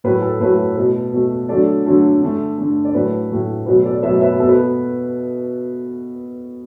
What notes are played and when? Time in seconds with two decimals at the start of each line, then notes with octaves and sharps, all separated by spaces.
0.04 A2 F#3 A3 B4
0.22 A4
0.40 A2 F#3 A3 B4
0.76 B2 A3 B4
1.13 B2 A3
1.49 D3 F#3 A3 A4 D5
1.86 D3 F#3 A3
2.22 D3 A3
2.58 D3 A3
2.85 D5
2.94 A2 F#3 A3 B4
3.30 A2 F#3 A3
3.66 B2 F#3 A3 B4
3.85 A4 D5
4.03 B2 F#3 A3 B4 E5
4.21 B4 E5
4.39 B3 A4
4.43 B2
4.49 B4